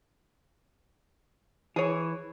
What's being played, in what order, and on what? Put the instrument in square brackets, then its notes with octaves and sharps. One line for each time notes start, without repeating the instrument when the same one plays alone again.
[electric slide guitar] E3 [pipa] G#4 C#5